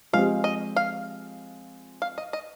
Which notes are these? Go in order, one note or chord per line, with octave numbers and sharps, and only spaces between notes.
F3 G#3 C4 G4 F5
D#5
F5
F5
D#5
D#5